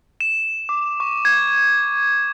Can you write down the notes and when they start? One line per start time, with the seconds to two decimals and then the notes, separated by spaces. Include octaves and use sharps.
0.21 E7
0.69 D6
1.00 C#6
1.25 G#6